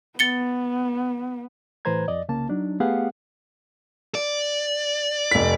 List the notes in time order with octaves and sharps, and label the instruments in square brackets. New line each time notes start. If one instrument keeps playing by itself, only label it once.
[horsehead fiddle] B3 [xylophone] A6 C#7 G7
[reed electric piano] A2 E3 B4 C5 A#5 G#6
F2 D5 D#5
C2 C#3 A#3 A5
F#3 D4 D#4
A3 B3 G4 G#4 F5 F#5
[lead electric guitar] D5
[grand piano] F1 B6